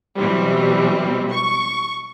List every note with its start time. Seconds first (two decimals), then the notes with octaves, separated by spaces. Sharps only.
0.18 B2 E3 F#3 G3 C4
1.33 C#6